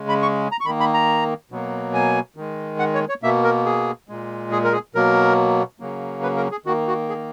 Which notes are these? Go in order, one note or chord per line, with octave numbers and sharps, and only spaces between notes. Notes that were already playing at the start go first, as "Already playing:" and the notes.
Already playing: C#3 G#3
B5
C#6
A#5
C#6
D#3 A#3 B5
B5
A#5
B2 F#3 A#3
G#5
D#3 G#3
F#5
C#5
C#5
B2 A#3 E5
A#4
G#4
A#2 G#3
G#4
A#4
G#4
B2 F#3 A#3 A#4
C#3 F#3 A#3
B4
A#4
G#4
D#3 A#3 F#4
F#4
G#4